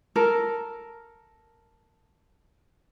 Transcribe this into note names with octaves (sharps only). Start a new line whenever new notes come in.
A4 A#4